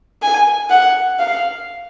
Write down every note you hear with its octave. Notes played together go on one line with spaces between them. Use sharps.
G#5
F#5
F5